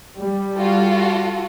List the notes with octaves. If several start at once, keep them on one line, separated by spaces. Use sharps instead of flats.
G3
F4 F#4 A4